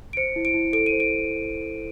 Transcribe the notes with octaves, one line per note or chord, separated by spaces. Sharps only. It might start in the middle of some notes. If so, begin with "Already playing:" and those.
D7
C5 C#7
E4
D7
E4
A4 D7
D#7
C5
D7